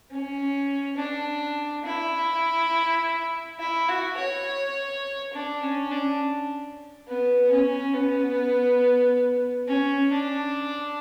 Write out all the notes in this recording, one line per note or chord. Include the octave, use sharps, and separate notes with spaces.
C#4
D4
E4
E4
F#4
C#5
D4
C#4
D4
B3
C#4
B3
C#4
D4